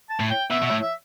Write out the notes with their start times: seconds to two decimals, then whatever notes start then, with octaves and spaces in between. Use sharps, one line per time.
0.10 A5
0.20 A2
0.30 G5
0.50 B2 E5
0.63 B2
0.66 E5
0.71 A2
0.82 E5